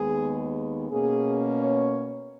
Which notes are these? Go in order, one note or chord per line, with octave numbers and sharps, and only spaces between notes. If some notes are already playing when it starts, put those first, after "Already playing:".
Already playing: D#2 D#3 G#3 B3 G#4
B2 A#3 C#4 G#4
C#5